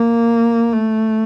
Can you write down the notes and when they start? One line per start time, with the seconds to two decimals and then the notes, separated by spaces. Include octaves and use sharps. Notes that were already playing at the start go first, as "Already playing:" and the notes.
Already playing: A#3
0.73 A3